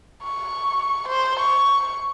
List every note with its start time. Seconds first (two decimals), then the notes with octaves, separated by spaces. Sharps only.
0.23 C#6
1.08 C5
1.40 C#6